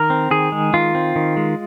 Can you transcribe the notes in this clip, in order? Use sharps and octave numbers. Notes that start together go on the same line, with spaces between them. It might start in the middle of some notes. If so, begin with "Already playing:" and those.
Already playing: D#3 A#4
C4
D#3 G#4
G#3
D#3 F4
C4
D#3
G#3